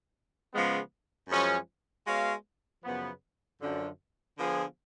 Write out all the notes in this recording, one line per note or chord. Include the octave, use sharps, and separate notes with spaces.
C#3 F3 G#3 B3
F#2 F3 G#3 C#4
G#3 B3 F#4 C#5 F5
F#2 C#3 F3 B3
F#2 D3 F3
D3 F3 B3 F4 G#4